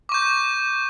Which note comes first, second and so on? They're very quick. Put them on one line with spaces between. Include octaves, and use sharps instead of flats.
D6 C#6 G6